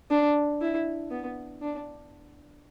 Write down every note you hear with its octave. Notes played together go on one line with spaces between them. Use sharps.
D4
E4
B3
D4